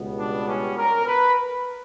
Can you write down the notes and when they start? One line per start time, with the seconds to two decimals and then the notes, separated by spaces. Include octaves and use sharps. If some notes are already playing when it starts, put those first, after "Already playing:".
Already playing: C#2 B2 G3 B3
0.18 D4
0.47 C#4
0.77 A#4
1.06 B4